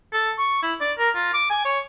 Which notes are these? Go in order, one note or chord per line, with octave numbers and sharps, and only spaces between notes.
A4
C#6
E4
D5
A#4
F4
D6
G#5
C#5